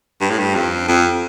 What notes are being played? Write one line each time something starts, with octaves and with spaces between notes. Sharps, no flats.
G2
A2
G2
F2
F2